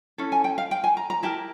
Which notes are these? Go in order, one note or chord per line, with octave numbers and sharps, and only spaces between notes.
C#4 E4 A4
G#5
G5
F5
G5
G#5
A#5
A#5
E4 G4 A#4 A5